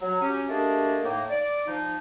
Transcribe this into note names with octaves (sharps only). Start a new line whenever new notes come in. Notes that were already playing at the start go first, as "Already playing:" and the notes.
F#3
F#3 C#4 G4
A3 A#3 D4 G4 G#4 D#5
A2 A#3 D#4
D5
F3 D#4